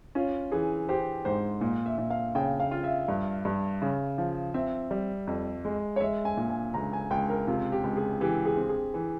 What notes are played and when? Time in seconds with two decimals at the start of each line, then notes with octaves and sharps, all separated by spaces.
0.15 C#4 F4
0.52 E3 G#4
0.89 G4 C5
1.25 G#2 C5
1.61 A#2
1.86 E5
1.98 A#2
2.10 F5
2.35 C#3 G5
2.60 F5
2.71 F4
2.84 E5
3.08 G2
3.45 G2
3.82 C#3
4.18 F3
4.54 C4 E5
4.91 G3
5.27 F2
5.65 G#3
5.96 C#5
6.01 G#3 E5
6.25 G#5
6.37 A#2
6.50 G#5
6.74 C#2 A#5
6.93 G#5
7.11 C#2 G5
7.29 A#4
7.47 C3 F4
7.72 G4
7.84 C#2
7.97 G#4
8.21 E3 G4
8.46 G#4
8.57 C4
8.69 G#4
8.94 E3